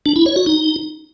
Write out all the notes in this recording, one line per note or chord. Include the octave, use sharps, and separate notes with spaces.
D4
E4
C#5
F#4
D#4